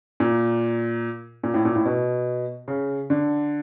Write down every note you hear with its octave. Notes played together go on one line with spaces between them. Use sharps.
A#2
A#2
A2
A#2
A2
B2
C#3
D3